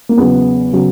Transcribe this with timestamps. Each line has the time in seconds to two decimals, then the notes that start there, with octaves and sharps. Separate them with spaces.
0.09 A#3
0.17 E2 C#3 F#3 B3
0.73 C#3 F#3